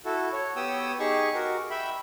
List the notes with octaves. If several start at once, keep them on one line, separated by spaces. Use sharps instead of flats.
E4 F#4 A4
C#5
B3 G4 C#5 G5 D#6 E6
D#4 G4 G#4 C#6
F#4 A#4
E5 G5 B5